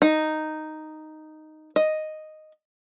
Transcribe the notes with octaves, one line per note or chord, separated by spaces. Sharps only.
D#4
D#5